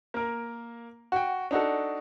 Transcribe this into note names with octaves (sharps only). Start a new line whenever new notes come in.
A#3 A#4
F#4 G5
D4 D#4 F#4 A4